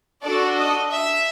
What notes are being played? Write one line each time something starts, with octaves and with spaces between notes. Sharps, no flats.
D4 F#4 A4 D5
D#5
E5